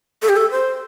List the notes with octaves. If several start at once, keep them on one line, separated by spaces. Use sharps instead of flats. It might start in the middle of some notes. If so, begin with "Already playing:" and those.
A4
G4
A4
C5